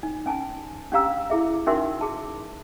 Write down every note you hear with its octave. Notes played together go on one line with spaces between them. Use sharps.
D#4
C#4 G#5 A5
C#4 D4 G4 F5 A#5 E6
E4 G#4 E5
C#4 D#4 F#4 A#4 E5 C6
G#4 A5